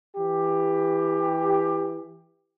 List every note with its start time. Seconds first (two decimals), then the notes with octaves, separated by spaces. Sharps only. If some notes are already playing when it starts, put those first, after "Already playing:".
0.16 E3 G4